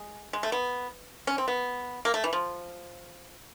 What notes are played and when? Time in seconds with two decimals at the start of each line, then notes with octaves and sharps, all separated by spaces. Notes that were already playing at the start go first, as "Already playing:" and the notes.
Already playing: G#3
0.33 G#3
0.43 A3
0.52 B3
1.27 C#4
1.38 C4
1.48 B3
2.05 A#3
2.14 A3
2.24 E3
2.33 F3